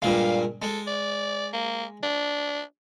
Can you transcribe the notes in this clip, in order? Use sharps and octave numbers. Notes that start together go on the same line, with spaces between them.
G2 A#2 G#3 F5
G#3 A4
D5
A#3
D4